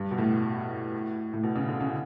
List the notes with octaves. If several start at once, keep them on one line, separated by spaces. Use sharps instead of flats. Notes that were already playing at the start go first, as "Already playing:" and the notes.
Already playing: G2
B2
A2
A2
B2
C#3
D3
C#3